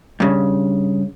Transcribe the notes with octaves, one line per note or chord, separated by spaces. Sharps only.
G2 C#3